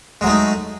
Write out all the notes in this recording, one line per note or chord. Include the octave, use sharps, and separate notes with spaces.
F#3 G#3 A3 D#4